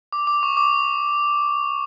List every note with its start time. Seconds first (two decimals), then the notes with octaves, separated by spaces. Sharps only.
0.12 D6
0.27 D6
0.43 C#6
0.57 D6